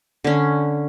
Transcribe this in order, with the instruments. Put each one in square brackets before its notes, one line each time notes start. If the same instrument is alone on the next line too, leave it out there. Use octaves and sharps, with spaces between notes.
[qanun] D3 C#4